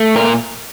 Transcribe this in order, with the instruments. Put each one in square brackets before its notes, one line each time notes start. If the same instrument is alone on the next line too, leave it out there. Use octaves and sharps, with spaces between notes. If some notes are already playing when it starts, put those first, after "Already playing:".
Already playing: [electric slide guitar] A3
A#2 A#4